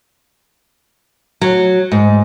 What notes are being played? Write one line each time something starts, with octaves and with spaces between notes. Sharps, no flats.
F#3
G#2